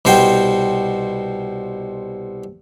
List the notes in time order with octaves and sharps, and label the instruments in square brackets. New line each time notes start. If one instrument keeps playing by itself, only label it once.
[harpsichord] C2 B2 C5 G5